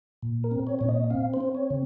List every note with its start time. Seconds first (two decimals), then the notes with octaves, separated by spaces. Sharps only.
0.23 A#2
0.44 A#4
0.51 C4
0.67 C#5
0.79 A#2 C#5
0.89 D#5
1.10 C4 F5
1.34 C5
1.41 C4
1.55 C#5
1.71 C#3